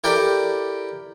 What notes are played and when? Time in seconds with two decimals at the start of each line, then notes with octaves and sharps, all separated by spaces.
0.04 E4 G4 A4 A#4 D5 G5